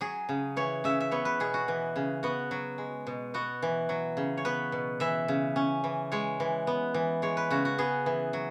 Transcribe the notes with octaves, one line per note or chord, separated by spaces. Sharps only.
F#3 G#4
C#3
E3 C#5
C#3 E5
E5
B3 C#5
B4
B2 G#4
F#4
E3
C#3
B3 F#4
F#3
G#3
B2
B3 F#4
E3
F#3
C#3
C#5
B3 B4
B2
E3 E5
C#3
C#4
E3
G#3 C#5
E3
B3
E3
G#3 C#5
B4
C#3 F#4
F#4
B3 G#4
E3
F#3